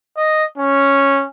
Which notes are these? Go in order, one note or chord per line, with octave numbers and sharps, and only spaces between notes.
D#5
C#4